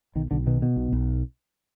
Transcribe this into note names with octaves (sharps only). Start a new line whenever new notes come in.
B1 D#3
B1 D3
B2 D#3
B2
B1
B1